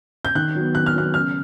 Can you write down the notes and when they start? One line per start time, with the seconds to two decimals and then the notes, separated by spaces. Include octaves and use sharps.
0.25 G6
0.35 D#3 F#6
0.55 F#3 B3
0.75 D#3 F#6
0.86 F6
0.95 F#3 B3 F#6
1.14 C#3 F6